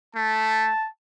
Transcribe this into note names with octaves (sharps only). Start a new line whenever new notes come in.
A3 A5